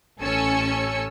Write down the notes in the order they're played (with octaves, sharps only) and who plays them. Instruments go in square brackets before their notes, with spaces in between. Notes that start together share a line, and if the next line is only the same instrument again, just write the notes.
[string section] A1 C#4 A4 G#5 E6 C#7